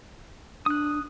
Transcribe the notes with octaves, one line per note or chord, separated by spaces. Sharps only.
D4 D#6 F#6